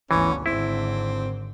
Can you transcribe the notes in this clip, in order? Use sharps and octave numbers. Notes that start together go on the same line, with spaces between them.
G1 D2 E3 C#4
G#1 D3 C4 E4